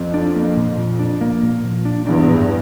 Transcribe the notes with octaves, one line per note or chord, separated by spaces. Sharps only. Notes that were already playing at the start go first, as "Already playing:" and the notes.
Already playing: F2 F3
D4
A#3
A#2
F3
D4
A#3
A#2
F3
D4
E2 G2 D4
A2